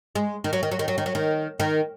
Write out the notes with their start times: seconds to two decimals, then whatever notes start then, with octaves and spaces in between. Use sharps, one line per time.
0.15 G#3
0.44 D#3
0.53 F#3
0.63 D#3
0.71 F#3
0.79 D#3
0.88 F#3
0.98 D#3
1.06 F#3
1.15 D#3
1.60 D#3